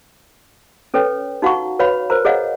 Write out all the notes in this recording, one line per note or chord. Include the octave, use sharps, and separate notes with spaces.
C#4 A4 B4 C#5 G5
D#4 F#4 F5 F#5 A#5 C#6
F#4 B4 C#5 F5 B5
A#4 C5 A#5
G#4 C#5 D#5 F5 F#5